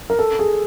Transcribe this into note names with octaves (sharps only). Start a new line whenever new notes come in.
A#4
A4
G#4